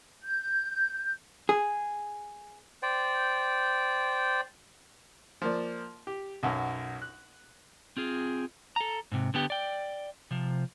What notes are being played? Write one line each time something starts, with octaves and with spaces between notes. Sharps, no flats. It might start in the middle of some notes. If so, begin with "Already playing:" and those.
G6
G#4
C5 D5 G5
F3 A#3 D5
G4
B1 F#2
F#6
C4 F4 G#4
A4 A#5
G#2 C3
D3 B3 G4
D5 G5
C3 F3